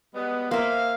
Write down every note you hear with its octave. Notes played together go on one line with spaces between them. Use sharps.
G3 G#3 B3
A#3 C5 E5 F5